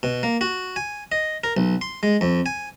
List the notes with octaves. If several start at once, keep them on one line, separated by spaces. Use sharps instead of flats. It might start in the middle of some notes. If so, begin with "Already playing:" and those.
B2
A#3
F#4
G#5
D#5
A#4
B1
C6
G#3
F2
G#5